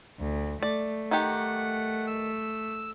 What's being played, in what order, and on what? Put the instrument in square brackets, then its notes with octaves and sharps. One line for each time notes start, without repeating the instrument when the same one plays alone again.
[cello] D2
[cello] A3 [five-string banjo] D5
[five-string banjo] D#3 G4 [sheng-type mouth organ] F#5
[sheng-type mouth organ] E6